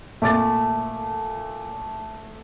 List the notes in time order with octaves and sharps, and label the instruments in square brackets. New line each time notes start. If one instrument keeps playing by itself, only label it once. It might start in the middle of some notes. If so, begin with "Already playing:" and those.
[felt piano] A#2 D6 A6 [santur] A3